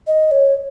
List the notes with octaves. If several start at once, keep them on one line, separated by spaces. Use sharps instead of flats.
D#5
C#5